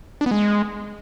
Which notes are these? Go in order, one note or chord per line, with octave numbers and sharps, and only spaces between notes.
D4
B3
G#3